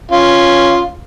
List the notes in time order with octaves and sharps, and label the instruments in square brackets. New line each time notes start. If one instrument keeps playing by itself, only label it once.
[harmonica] C#4 F4